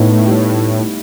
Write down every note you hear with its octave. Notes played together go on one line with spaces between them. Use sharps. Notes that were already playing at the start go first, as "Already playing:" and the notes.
Already playing: A2 B3 D#4 E4
A3
G3